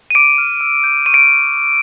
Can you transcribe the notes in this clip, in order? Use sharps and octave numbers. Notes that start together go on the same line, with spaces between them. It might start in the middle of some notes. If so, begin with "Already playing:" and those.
D#7
D6 D7
F6
E6
G6
C#6 D#7
D7